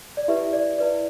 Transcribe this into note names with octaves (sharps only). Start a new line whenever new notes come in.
D5
E4 G4 B4 E5
D5
E4 B4 D5